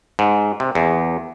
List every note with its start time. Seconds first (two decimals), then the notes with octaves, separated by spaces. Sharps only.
0.19 G#2
0.60 C3
0.75 E2